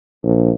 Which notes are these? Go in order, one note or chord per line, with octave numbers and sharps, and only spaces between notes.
A#1